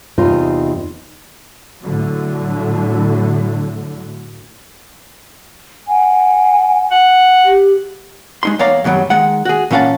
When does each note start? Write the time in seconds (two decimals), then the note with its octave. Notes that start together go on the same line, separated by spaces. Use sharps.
0.18 E2 C3 D#4 F4
1.81 A2 D3 F#3
5.87 F#5 G#5
6.91 F#5
7.45 G4
8.43 G#3 D#4 C6
8.59 E2 C#5 D5 F5 A#5
8.84 F#2 B2 D#3 F#3 G3
9.10 D#3 G#3 F#5
9.45 F#4 G#4
9.71 A#2 E3 C#4 F5 F#5 A5